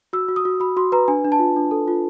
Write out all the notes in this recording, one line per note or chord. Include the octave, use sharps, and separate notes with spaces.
F#4 E6
F#4
D#6
F#4
F#4 B5
F#4 C6
B4 A#5
D4 G#5
D4
A5
F4
D4
A4
F4